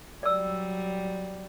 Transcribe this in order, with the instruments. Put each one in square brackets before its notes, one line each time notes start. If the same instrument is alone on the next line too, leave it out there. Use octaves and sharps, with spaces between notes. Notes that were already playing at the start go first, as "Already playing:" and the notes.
[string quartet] F#3 G3 [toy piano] D5 E6